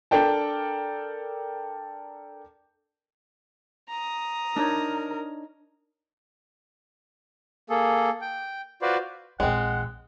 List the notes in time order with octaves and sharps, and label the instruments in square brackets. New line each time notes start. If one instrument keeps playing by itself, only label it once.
[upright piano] D4 A4 A#4 D5 G5 A5
[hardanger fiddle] A#5 D#6
[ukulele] D4 D#4 C#5 [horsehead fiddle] A#4
[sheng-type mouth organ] A#3 G#4 A4
G5
F4 F#4 B4 C5 D5
[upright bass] A#1 E2 [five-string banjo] G#3 C4 [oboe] F#5